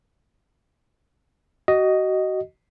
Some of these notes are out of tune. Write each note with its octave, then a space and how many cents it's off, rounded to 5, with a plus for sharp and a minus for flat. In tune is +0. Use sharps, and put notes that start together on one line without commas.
F#4 +30 D#5 +0